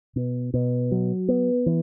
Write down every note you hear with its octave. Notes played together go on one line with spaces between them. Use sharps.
B2
B2
F#3
B3
E3